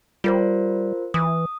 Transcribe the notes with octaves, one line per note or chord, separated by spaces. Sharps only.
G3 F4 A#4 C5
E3 D#6